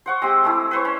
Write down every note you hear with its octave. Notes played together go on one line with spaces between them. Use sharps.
C5 F#5 C#6
G#3 C4 G4
G#3 A3 E4
B4 C5 C#6
C#4